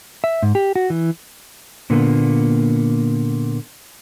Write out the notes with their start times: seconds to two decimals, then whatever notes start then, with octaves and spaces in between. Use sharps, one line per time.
0.24 E5
0.42 G#2
0.55 G4
0.76 F#4
0.90 E3
1.90 A#2 D3 A#3 B3